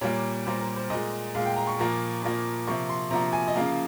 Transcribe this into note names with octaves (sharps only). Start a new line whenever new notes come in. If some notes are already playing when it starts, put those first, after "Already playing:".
A#2 G3 A#3 C#5
A#2 G3 A#3 C5
A#4
C5
A#2 G#3 D#5
A#2 G#3 F5
G5
A#5
C#6
A#2 F3 A#3
A#2 F3 A#3
C3 F3 A#3 C#6
C6
C3 F3 A#3 A#5
G#5
D#5
C#3 F3 A#3 F5